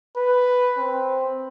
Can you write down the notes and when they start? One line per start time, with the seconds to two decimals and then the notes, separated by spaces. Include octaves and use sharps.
0.16 B4
0.78 C4